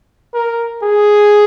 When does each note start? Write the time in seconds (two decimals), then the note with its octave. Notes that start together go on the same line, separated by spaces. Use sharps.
0.34 A#4
0.83 G#4